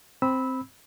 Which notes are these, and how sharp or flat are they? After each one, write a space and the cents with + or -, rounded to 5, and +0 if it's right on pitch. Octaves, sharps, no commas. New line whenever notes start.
C4 +0 B5 +0 E6 -20